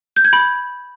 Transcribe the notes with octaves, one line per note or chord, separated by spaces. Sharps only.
G6
G#6
B5